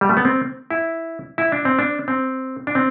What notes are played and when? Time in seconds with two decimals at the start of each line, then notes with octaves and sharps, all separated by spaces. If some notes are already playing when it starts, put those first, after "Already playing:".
0.01 G3
0.09 A3
0.17 B3
0.25 C4
0.71 E4
1.38 E4
1.52 D4
1.65 C4
1.79 D4
2.08 C4
2.67 D4
2.75 C4